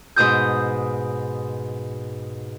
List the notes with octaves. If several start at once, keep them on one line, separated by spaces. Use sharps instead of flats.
G#2 B2 D#6 G6